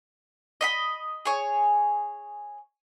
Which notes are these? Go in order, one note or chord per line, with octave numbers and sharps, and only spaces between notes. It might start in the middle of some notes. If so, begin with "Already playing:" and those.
D#5 E5 B5
G#4 C#5